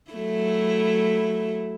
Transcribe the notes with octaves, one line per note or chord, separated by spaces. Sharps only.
F#3 A3 E4